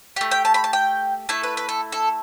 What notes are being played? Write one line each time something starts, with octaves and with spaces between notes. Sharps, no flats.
A3 G4
G5
A5
B5
A5
G5
A3 E4 A4
B4
B4
A4
A4